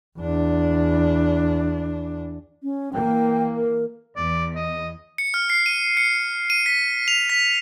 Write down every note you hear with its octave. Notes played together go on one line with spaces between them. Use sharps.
E2 D4
C#4
E3 A#3 G5
A#4
E2 D5
D#5
C#7
F6
C7
D#7
C#7
D#7
B6
F7
B6